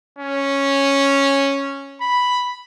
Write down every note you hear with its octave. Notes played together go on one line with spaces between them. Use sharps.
C#4
B5